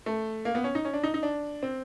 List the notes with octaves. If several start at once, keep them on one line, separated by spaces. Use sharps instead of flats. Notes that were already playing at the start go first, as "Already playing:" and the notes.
A3
A#3
B3
C#4
D#4
C#4
D4
D#4
D#4
D4
C4